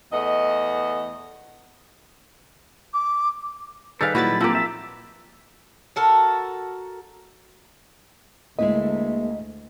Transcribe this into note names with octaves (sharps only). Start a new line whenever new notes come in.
E2 A3 B3 D#5
D6
D#3 G3 G#4 A4 B4 F5
A#2 F#3 E4 F#4 B4 A6
F3 A#3 C4 E4 F#4 G4
E5
F#4 A4 A#4
D2 G#3 A#3 E4 B4 D#5